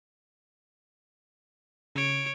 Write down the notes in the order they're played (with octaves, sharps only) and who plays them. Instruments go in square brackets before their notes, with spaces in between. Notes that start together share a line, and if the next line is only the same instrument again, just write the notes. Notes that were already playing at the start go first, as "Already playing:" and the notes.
[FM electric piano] C#3 [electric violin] C#5 D7